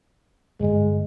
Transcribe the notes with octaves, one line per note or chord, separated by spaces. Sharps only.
D1 G1 G#3